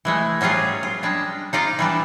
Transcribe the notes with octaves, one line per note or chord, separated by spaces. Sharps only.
E3 G#3 A3
F#3 G3 C#4 F4 G#4
F4
G3 G#3 D4
D#4 F4 D5 F5
E3 G3 D4